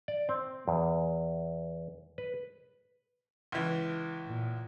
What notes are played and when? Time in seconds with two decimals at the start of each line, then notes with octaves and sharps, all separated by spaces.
0.08 D5
0.29 C4
0.68 E2
2.18 B4
3.52 C#2 E3
4.26 A#2